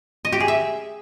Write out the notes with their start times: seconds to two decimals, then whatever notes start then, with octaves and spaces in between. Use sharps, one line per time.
0.25 D#5
0.32 G4
0.40 G#4
0.48 E5